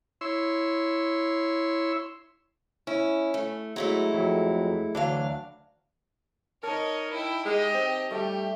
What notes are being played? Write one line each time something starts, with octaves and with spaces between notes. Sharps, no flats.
E4 C#5 C6 E6
C#4 E4
A3
F#3 G#3 A3 E4
F2 F#3
D2 E3 F#3 D4 F5
D#4 A#4 C#5 D#5 A5
E4 G5
G#3 G4 D#5
C4
G3 A3 G4